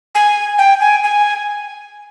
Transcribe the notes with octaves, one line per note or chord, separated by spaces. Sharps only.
G#5
G5
G#5
G#5